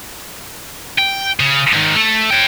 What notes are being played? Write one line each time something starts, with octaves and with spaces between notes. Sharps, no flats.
G5
C#3
G#2 D#3
A3
C#5 G5